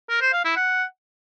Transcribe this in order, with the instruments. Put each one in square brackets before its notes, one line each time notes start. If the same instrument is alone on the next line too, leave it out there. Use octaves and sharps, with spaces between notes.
[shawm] A#4
C5
F5
E4
F#5